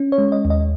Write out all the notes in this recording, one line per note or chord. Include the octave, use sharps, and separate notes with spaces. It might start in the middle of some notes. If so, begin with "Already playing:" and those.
Already playing: C#4
C#5
G#3
D#5
D#2
D#5